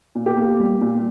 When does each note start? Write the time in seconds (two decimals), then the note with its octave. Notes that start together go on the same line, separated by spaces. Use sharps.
0.15 A#2
0.26 G4
0.36 A#3
0.60 G3
0.81 A#2